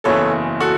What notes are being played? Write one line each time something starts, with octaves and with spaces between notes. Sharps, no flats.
F#1 E2 C#3 E3 A4 C#5
F#4 A4